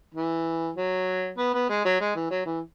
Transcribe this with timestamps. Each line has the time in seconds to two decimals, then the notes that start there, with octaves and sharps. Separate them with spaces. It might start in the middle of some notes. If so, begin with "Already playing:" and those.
0.14 E3
0.76 F#3
1.37 B3
1.54 B3
1.69 G#3
1.85 F#3
2.00 G#3
2.15 E3
2.31 F#3
2.46 E3